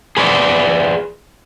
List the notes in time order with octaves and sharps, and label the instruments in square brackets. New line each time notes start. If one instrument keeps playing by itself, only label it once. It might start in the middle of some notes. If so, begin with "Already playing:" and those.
[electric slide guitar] G#4 B4 C5 D5